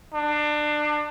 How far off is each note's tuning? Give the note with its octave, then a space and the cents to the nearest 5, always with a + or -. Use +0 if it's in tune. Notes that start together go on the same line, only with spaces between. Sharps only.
D4 +25